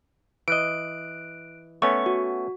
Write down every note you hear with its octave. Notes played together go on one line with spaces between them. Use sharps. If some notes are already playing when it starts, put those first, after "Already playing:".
E3 D#5 F#6 D7
A3 B3 C#4 C#6
F#4